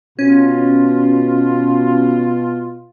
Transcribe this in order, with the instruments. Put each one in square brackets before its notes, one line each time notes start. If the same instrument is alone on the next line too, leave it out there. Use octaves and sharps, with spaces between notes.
[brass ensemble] B2 F4 [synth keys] C#4